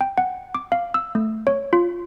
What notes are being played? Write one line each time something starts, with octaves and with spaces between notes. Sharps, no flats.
G5
F#5
D6
F5
E6
A3
C#5
F4